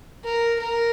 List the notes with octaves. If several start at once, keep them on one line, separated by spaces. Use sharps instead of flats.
A#4
A#4